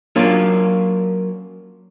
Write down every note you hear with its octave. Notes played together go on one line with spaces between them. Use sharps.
F#3 A#3 C#4 D4 F4